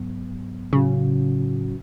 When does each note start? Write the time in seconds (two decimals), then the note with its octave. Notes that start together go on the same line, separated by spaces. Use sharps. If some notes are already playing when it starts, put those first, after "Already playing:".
Already playing: G#2 F#3 B3
0.73 A2 C#3 F#3 C#4 F#4